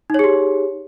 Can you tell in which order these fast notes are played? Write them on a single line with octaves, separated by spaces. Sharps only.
D#4 C#5 G#4 G4